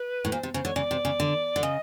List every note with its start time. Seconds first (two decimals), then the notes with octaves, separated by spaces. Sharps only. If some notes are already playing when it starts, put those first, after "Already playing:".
Already playing: B4
0.25 A2
0.32 A#2 C5
0.43 C3
0.54 C#3 C5
0.65 D3 C#5
0.76 C#3 D5
0.91 C3
1.05 C#3
1.20 D3
1.56 D3
1.63 C#3 D#5